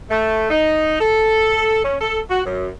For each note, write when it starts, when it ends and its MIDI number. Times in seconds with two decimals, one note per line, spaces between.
0.10 0.48 57
0.50 0.96 63
0.99 1.82 69
1.83 1.96 61
2.00 2.19 69
2.29 2.40 66
2.45 2.68 42